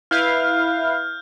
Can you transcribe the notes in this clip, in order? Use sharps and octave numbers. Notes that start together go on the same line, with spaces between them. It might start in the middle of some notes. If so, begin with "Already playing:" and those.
E4 B4 F5 F6 G6